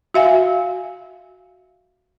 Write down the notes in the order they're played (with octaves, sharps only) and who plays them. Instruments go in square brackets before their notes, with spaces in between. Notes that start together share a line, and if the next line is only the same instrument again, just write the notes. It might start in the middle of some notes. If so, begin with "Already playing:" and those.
[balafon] F#4 E5 F5 G#5